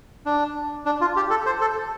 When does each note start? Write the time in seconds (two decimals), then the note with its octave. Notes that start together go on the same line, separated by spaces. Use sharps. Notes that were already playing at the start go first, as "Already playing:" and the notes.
0.26 D4
0.86 D4
1.01 F4
1.16 G4
1.30 A4
1.46 C5
1.61 A4